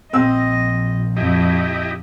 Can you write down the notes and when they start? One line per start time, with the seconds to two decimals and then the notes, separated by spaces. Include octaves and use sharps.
0.13 A#1 C4 D#5 E6
1.17 F2 E4 G4 D#5